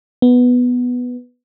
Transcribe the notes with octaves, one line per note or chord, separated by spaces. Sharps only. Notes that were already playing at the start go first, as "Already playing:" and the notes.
B3